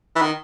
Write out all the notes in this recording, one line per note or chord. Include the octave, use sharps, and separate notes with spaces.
E3
D#3